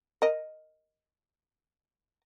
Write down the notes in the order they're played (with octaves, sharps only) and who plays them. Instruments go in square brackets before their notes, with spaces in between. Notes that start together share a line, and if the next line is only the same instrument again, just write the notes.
[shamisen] A#4 D#5